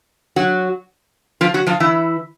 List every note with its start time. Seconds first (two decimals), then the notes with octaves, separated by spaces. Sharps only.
0.36 F#3 F#4
1.41 F3 F4
1.54 F#3 F#4
1.67 F3 F4
1.80 E3 E4